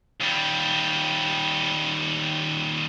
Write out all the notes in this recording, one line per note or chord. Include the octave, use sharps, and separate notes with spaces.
D#2 G3